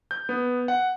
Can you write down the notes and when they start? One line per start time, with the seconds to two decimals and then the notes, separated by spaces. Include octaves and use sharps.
0.11 G6
0.29 B3
0.68 F#5